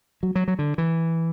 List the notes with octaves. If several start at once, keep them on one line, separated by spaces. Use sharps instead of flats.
F#3
F#3
F#3
D3
E3